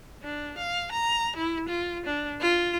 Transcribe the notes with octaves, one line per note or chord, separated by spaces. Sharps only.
D4
F5
A#5
E4
F4
D4
F4